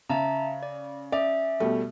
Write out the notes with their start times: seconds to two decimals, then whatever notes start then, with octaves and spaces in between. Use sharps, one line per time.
0.09 C#3 E5 A5 A#5
0.63 D5
1.12 C#4 D5 E5
1.60 B2 G3 A3